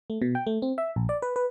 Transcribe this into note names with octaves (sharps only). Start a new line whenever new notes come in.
A3
B2
G5
A3
C4
E5
A#1
D5
B4
B4